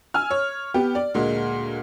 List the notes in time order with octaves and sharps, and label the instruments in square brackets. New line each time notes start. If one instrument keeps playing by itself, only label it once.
[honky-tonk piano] G#5 E6 F6
C#5
B3 G4
D5
D2 A#2 G#3